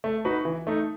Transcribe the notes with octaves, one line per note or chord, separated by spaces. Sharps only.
A3
D#4 F#4 B4
E3
A3 D#4